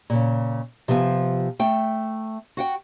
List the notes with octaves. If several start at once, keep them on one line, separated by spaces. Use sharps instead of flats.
A#2 C#3
C3 F3 B3 D5 G#5
A3 G5
F#4 F#5 G5